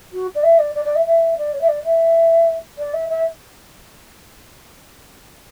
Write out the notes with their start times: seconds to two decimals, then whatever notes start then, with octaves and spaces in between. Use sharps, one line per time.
0.13 F#4
0.35 D5
0.43 E5
0.59 D5
0.75 D5
0.85 D5
0.95 E5
1.06 E5
1.38 D5
1.53 C#5
1.61 E5
1.68 D5
1.84 E5
2.78 D5
2.94 E5
3.09 E5